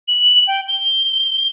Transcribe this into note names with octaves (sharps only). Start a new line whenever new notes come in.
F#7
G5
G7